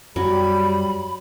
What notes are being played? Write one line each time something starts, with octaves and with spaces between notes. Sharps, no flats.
F#2 F#3 G3 B5